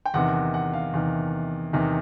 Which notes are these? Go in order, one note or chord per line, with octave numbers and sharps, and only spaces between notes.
G5
E2 C3 D#3 F#5
F#5
F#5
F5
E2 C3 D#3
E2 C3 D#3